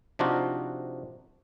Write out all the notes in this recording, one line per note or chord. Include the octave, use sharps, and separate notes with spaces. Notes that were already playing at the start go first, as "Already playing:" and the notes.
C3 F3 D4 D#4 F4 F#4